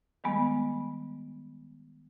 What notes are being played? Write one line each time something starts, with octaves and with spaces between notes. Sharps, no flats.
D#3 G3 G#3 B3